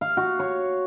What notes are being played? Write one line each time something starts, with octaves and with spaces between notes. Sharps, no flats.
F5
F#4
C#5